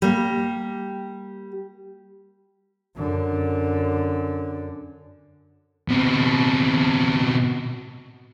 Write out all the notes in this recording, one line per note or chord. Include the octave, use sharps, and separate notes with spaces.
G3 A#3
F#2 D3
B2 C4